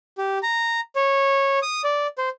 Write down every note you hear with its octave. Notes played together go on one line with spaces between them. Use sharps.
G4
A#5
C#5
D#6
D5
C5